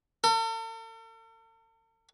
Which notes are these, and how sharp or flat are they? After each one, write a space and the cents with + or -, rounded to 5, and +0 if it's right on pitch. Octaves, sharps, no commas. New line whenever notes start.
A4 +45